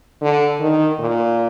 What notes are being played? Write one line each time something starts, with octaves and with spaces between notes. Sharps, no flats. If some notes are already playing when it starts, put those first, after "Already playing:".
D3
D#3
A#2